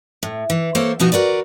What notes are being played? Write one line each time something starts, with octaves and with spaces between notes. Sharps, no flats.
A2
E3
A#3 A4 C5 C#5
B2 F3 B3 D#4 F#4
F#4 A#4 B4 D5